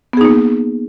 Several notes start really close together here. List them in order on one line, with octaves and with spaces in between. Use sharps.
B3 G#4 D#4 A#3